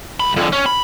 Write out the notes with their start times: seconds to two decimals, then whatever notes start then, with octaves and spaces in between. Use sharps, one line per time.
0.20 C2 B5
0.36 F2 D3
0.53 C#4
0.66 B5